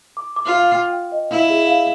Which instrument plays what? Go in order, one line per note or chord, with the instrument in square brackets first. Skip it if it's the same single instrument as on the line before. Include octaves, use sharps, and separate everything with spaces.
[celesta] D6
D6
[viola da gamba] F4
[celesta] F5
G5
G5
D#5
[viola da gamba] E4 [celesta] F5
[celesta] G#4
F5